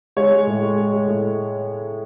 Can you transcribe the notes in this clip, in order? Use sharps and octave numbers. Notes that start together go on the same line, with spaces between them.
G#3 C#5
G#3
A2
G#3
G#3
G#3
A2